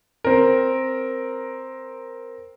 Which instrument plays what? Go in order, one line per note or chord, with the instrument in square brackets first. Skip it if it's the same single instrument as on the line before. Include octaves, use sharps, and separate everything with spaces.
[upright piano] C4 A#4